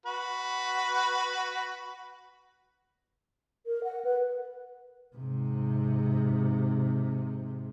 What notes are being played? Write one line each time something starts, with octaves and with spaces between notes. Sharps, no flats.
F#4 B4
A#4
F#5
B4
G#2 C3